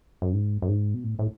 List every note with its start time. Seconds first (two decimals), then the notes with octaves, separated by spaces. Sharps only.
0.22 F#2
0.33 G#2
0.62 F#2
0.68 G#2
0.94 B2
1.04 A2
1.19 A2